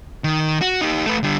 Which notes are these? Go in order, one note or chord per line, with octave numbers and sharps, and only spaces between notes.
D#3
F#4
D#4 G4
A3 B4
D3 G3